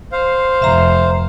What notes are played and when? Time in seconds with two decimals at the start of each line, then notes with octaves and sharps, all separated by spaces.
0.12 C5 F5
0.62 F1 E5 A#5